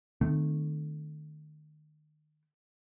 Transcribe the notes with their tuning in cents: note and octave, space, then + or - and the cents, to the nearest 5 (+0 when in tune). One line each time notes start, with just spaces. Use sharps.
D#3 -35 A3 -5 C4 -30